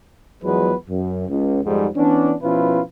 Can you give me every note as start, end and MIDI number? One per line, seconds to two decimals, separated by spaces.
0.43 0.73 40
0.43 0.73 53
0.43 0.73 54
0.43 0.73 56
0.43 0.73 59
0.43 0.73 71
0.89 1.26 42
1.29 1.60 37
1.65 1.88 41
1.65 1.88 44
1.65 1.88 55
1.96 2.34 52
1.96 2.34 59
1.96 2.34 61
1.96 2.34 62
2.42 2.81 47
2.42 2.81 53
2.42 2.81 61
2.42 2.81 64
2.42 2.81 65
2.42 2.81 71